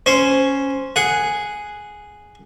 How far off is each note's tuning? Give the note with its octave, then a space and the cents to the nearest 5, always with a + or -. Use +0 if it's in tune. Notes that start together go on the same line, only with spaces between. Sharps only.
C#4 +0 C5 +0
G#4 +0 F#5 +0